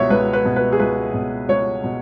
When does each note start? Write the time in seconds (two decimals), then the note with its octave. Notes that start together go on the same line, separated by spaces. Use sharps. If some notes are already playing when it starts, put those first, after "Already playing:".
Already playing: C#2 B2 C#5 E5
0.10 C#2 B4
0.33 B4
0.45 B2
0.56 B4
0.72 G#4
0.79 C#2 B4
1.14 B2
1.49 C#2 C#5
1.84 B2